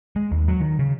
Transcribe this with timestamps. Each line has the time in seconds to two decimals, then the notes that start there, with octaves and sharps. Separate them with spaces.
0.16 G#3
0.31 D#2
0.48 F#3
0.60 D#3
0.79 C#3